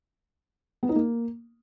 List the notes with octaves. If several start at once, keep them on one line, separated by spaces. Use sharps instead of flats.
B3
D#4
A#3